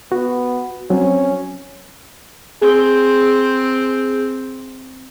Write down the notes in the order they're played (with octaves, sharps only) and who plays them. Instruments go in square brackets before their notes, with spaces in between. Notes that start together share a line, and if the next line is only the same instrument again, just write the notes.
[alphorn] B3 [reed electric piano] F#4
[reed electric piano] F#3 C4 [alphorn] C#4
[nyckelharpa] C4 [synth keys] G#4